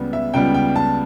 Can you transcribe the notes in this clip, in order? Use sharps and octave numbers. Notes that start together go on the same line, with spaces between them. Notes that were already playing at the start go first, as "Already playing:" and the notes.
Already playing: C#2 C#3 G3 B3
E5
C#2 C#3 G3 B3 G5
G5
A5